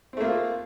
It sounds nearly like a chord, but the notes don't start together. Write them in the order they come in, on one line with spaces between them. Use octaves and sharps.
C4 A3 A#3 F4